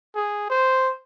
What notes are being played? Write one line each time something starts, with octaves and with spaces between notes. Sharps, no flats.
G#4
C5